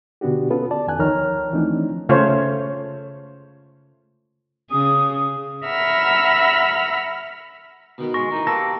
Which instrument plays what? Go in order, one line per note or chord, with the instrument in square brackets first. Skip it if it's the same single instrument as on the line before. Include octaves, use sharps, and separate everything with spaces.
[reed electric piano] B2 D3 B3 D4 F#4 G4
B3 C#4 F4 A4 B4
D5 A5
F2 D#3 G#5 F#6
D2 D#3 F3 C#5 A#5 F6
E3 F3 A3 C4 D4 D#4
[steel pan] C#3 A3 F4 C5 C#5
[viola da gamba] C#3 G#4 [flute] D#6
[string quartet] E5 F#5 A#5 B5 E6 F6
[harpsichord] B2 D#3 B3
[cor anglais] G#3 [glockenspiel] C#6 A#6
[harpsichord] A#2 E3 [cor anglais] D#4
[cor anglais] A#3 [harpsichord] G4 B4 [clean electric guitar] A4 [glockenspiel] A#6